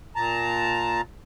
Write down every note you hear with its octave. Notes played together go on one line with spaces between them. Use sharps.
A#2 A5 A#5